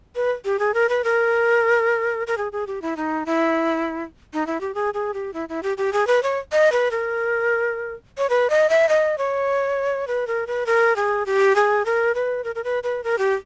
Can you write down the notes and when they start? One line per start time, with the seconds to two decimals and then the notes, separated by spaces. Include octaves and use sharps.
0.15 B4
0.45 G4
0.59 G#4
0.74 A#4
0.89 B4
1.04 A#4
2.27 A#4
2.37 G#4
2.52 G#4
2.67 G4
2.82 E4
2.97 D#4
3.26 E4
4.33 D#4
4.47 E4
4.61 G4
4.75 G#4
4.94 G#4
5.14 G4
5.33 E4
5.49 E4
5.63 G4
5.77 G4
5.93 G#4
6.07 B4
6.23 C#5
6.52 D#5
6.72 B4
6.91 A#4
8.18 C#5
8.30 B4
8.50 D#5
8.70 E5
8.89 D#5
9.18 C#5
10.07 B4
10.27 A#4
10.47 B4
10.66 A#4
10.96 G#4
11.26 G4
11.56 G#4
11.85 A#4
12.15 B4
12.44 A#4
12.55 A#4
12.64 B4
12.83 B4
13.04 A#4
13.18 G4